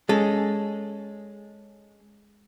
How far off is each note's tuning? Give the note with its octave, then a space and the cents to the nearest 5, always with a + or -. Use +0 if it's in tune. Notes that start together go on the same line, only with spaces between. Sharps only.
G#3 +0 C#4 +5 A4 +0